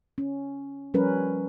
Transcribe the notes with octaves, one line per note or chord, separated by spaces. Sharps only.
C#4
F3 G3 C#4 A#4 B4